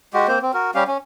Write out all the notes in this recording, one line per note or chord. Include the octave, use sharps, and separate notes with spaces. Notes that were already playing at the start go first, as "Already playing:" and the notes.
G#3 F#4 G4
A#3 C4 C5
C4
F#4 A#4
G3 C#4 G4 F5
C#4